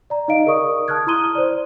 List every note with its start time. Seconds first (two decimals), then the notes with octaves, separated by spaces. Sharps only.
0.10 D5 A#5
0.28 D#4 D#5 F5 D7
0.46 G#4 A#4 D5 C#6 D#6
0.88 A5 D#6 F6 F#6 G#6
1.07 E4 A#5 C6 D#6 D#7 G7
1.35 C5 D5